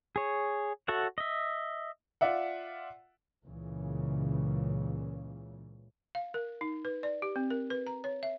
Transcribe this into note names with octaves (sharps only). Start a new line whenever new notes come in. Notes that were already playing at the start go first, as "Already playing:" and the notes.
G#4 C#5
F#4 A4 C#5 E5 F#5
D#5 E5
F4 D5 E5 F#5
C#2 A#2 C#3 E3
F5
A#4
D#4
B4
D5
G4
C4
A#4
B4
A#5
C#5
E5